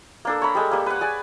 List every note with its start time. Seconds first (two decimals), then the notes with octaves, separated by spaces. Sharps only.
0.25 A#3 D4 A4
0.42 C#5 A#5 B5
0.55 G3 G#3 A4
0.71 G3 A#3
0.86 B4 F#5
1.01 G#4 D5 G#5